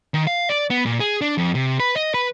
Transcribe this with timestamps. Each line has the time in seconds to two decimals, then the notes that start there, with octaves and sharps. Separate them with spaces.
0.14 D#3
0.27 F5
0.50 D5
0.70 B3
0.86 A#2
1.00 G#4
1.21 D4
1.38 F2
1.55 C3
1.80 B4
1.96 D#5
2.14 B4